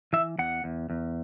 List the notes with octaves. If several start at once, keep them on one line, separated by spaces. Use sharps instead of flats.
E3 E5
E2 F#5
E2
E2